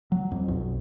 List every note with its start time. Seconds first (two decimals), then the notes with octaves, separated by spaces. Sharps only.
0.12 F#3
0.31 F2
0.48 B1